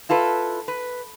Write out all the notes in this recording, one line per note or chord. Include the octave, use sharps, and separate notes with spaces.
E4 F4 A4 B4
B4